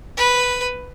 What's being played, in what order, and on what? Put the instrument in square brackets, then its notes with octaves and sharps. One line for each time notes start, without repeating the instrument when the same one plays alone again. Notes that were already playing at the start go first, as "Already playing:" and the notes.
[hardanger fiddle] B4